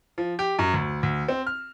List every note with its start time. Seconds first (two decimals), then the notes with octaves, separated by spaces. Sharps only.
0.18 F3
0.39 G4
0.59 F#2
0.74 D2
1.03 D2
1.28 C4
1.47 F6